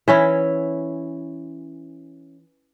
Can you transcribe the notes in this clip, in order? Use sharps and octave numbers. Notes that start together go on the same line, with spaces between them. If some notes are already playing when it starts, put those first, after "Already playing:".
E3 C#4 E4